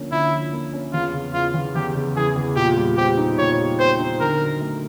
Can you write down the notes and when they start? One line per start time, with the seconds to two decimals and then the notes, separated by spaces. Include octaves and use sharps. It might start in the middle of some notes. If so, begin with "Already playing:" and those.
Already playing: D3 F3 A#3 C#4
0.12 D3 E4
0.32 F3
0.53 A#3
0.73 C#4
0.93 E2 F4
1.13 C#3
1.34 E3 F4
1.54 E2
1.75 E2 G4
1.95 C#3
2.16 E3 G#4
2.36 E2
2.56 A#2 G4
2.77 G3
2.97 C4 G4
3.17 D#4
3.38 A#2 C#5
3.59 G3
3.79 C4 C5
4.00 D#4
4.20 D3 A#4
4.41 F#3
4.60 A3